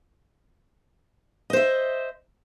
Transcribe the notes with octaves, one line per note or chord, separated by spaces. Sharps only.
C5 D#5 E5